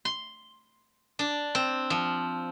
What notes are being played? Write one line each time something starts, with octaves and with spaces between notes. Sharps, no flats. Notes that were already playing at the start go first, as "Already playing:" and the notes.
C6
D4
C4
F3